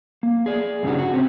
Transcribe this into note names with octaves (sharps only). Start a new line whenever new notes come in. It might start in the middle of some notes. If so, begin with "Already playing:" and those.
A#3
G#4 D5
G2 C#3 G3 A3 D4 F#4
F#4
C3 C4 C#4